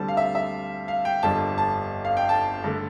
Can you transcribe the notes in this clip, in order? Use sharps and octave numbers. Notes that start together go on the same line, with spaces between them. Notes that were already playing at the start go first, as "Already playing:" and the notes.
Already playing: D2 D3 G3 C4 A5
F5
E5
E5
F5
G5
G1 F2 D3 G3 A5
A5
F5
G5
A5
G2 D3 A3